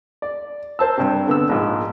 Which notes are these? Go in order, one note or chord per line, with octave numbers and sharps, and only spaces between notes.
D5
A#4 C5 A5 E6
G2 C3
D3 B3 E6
A#1 G#2